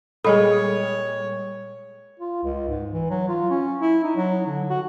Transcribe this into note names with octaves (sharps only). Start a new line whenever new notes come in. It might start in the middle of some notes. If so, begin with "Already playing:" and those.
A#2 G3 G#3 G#4 A4 C#5 D#5 B5
F4
C#2
G#2
E3
F#3
F4
C#4
E4
D#4
F#3
D3
F#4